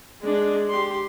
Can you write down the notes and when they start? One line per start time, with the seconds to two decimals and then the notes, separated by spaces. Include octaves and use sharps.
0.21 G#3 D4
0.70 G4 C6